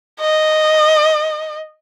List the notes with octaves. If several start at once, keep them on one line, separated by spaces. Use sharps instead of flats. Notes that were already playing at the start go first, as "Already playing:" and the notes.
D#5